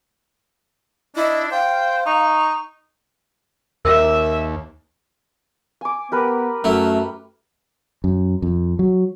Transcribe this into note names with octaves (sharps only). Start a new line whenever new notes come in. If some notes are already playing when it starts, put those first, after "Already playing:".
D4 E4 D#5
C5 F5 G5
D#4 C#6
D#2 A#4 E5 E6
G#5 D6
B3 G4 A#4 B4
F#2 F#3 A3 E4
F#2
F2
F#3